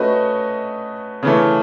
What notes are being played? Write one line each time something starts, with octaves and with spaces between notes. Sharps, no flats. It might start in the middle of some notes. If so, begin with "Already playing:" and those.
Already playing: A3 C#4 F#4 B4 D#5
C#3 E3 A3